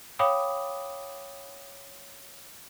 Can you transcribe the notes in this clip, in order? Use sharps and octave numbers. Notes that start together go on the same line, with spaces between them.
C#5 F5 G5 B5 D6 D#6